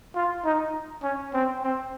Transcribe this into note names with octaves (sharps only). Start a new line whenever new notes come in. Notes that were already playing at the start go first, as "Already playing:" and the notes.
F4
D#4
C#4
C4
C4